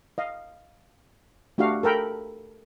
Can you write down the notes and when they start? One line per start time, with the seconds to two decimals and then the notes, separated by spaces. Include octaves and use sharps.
0.18 D#5 F5
1.58 A3 D4 F#4 G4 F5
1.83 A4 A#4 G5 B5